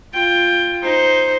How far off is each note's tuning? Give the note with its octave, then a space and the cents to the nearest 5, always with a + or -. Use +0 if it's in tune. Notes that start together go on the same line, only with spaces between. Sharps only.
F4 +0 G5 +15
D#4 +5 C5 +0